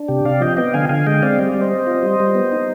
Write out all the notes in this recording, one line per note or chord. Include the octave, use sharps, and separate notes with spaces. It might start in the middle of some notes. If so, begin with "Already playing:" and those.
Already playing: D4
C3 G4
C3 D5 F5
F3 D#5 G5
B3 D#5 G5
D3 F5 G#5
D3 F5 G#5
G#3 D#5 G5
C4 D5 F5
G3 D#5
G3 D5
C5 D#5
C4
F4
G3
G3
B3
D#4